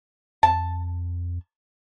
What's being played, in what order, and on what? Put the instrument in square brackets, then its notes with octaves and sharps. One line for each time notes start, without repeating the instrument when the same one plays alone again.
[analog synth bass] F2 [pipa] A5